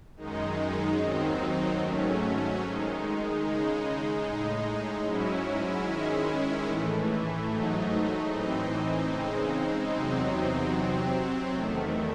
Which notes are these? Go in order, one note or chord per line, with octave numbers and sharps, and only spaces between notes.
F#2 D#3 G#3 D#4
D#2 D#3 F#3 C4 D#4
G#2 F#3 A3 C#4
D#3 G#3 D#4
C#3 G#3 D#4
A2 G#3 D#4
G#2 F#3 C#4 E4
D#3 G#3 C#4 E4
A2 E3 A3
G#2 F#3 A3 D#4
A2 E3 C4 D#4
C#3 G#3 C4 D#4
E2 C3 F#3 C4 D#4
C3 F#3 C4
E2 D#3 A3